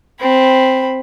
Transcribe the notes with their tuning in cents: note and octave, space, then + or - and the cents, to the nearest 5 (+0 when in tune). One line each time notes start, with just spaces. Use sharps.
C4 +0 B5 +0